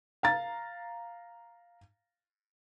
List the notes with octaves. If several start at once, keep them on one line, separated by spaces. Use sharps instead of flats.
F5 A#5 A6